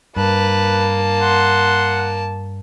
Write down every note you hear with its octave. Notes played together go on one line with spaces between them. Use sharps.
G2 A#3 B4 A5
F#5 C6